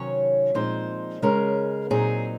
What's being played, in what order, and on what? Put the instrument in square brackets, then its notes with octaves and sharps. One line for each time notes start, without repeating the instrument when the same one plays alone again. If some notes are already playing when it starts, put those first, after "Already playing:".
Already playing: [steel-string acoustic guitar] C3 D#3 F#3 C#4 C#5
A#2 F3 G#3 C4 D#4 C5
C#3 G#3 C#4 A#4
A#2 F#3 C4 D#4 G#4